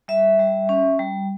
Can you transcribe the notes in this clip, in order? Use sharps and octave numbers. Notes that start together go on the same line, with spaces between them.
G3 E5
G3
C#4
G3